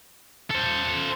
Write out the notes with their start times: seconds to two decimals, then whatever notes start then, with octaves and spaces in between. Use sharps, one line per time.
0.50 A4 C5